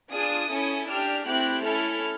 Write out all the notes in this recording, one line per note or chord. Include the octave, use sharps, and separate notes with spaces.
D4 F4 G#4 D#6
C#4 E4 A4
D4 G4 F6
A3 C4 E4 G4 F#6
C#4 E4 A4 F6